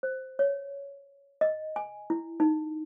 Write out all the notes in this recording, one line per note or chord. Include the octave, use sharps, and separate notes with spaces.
C5
C#5
D#5
G#5
E4
D#4